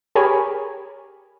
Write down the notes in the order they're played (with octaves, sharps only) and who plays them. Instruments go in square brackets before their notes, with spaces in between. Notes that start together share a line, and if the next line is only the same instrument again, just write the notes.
[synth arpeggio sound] G4 G#4 A#4 C#5 G#5 B5